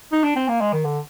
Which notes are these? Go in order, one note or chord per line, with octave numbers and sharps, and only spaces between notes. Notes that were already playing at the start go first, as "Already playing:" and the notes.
D#4
D4
C4
A#3
G#3
D#3
D3